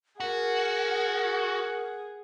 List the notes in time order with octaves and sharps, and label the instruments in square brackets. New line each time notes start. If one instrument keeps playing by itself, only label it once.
[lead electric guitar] F#4 [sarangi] G#4 [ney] A#4 [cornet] F#5